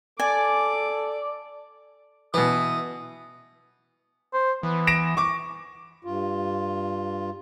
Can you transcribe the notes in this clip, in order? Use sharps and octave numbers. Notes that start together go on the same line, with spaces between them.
A4 D5 G#5 D6
B2 E3 B4 D#6
C5
E3 B3
A#6 D7 E7
C#6 D6
G2 F4